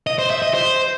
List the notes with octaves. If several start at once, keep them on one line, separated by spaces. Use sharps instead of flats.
D#5
C5
E5
D#5
C5